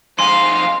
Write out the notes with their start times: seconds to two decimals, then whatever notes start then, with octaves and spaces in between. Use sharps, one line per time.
0.19 F2 D#4 F5 G#5 C6